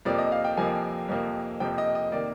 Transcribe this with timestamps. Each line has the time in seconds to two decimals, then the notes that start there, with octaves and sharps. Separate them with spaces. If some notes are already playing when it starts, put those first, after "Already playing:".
0.05 F2 C3 F3 A#3 D5
0.18 D#5
0.32 F5
0.44 G5
0.57 F2 C3 F3 A#3 G#5
1.09 F2 C3 F3 A#3
1.60 F2 C3 F3 A#3 G5
1.78 D#5
1.95 D#5
2.12 C3 D#3 A#3 D5